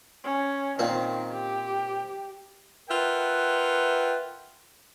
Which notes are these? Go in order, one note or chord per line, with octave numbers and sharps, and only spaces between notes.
C#4
A#2 D#3 C4
G4
F4 A#4 B4 E5 F#5 G5